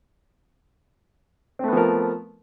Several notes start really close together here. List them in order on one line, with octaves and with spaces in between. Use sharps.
C4 A3 B3 F3 A#4